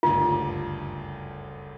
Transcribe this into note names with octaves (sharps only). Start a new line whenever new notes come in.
F#1 D2 G2 F4